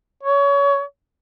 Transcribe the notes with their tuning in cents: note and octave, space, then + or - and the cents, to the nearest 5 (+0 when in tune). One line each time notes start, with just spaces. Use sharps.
C#5 +25